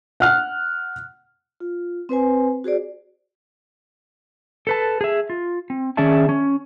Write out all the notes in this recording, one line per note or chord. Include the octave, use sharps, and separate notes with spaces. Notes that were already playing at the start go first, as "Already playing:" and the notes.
F#5 F6 F#6
F4
C4 B4 C5 G#5
F#4 G#4 C5 D5
A4 B4 A5
G#4 E5
F4
C4
D#3 C#4 G#4 D5 E5 A5
C#4